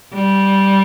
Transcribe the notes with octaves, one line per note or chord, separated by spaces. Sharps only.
G3